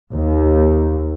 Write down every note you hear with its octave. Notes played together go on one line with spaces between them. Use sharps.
D#2